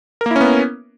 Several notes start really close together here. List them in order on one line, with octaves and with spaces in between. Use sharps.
A#4 A#3 E4 C#4 B3